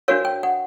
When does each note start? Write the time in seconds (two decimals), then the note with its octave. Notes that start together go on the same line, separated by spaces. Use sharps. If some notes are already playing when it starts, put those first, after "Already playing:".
0.08 D4 F#4 A#4 C#5 F5
0.25 G5
0.43 F#5